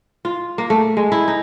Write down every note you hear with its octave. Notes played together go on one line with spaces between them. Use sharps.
F4
A#3
A3
G#3
E4
D#4